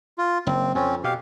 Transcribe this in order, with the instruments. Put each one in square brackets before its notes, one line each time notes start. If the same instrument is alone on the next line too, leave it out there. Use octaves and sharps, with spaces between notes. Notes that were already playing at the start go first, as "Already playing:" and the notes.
[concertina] F4
[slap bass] F#1 [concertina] C4
[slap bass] F2 [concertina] C4 C#4
[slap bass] B2 [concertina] G4 F5